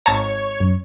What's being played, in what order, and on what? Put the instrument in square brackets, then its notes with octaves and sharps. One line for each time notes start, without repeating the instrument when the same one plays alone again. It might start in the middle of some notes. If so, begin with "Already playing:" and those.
[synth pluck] G#1 A5 A#5 [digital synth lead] C#5
[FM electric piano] F#2